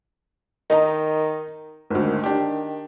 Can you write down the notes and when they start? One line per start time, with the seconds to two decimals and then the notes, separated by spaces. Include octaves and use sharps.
0.70 D#3 D#4 D#5 A#5
1.91 G#1 D2 D#3
2.24 D4 G4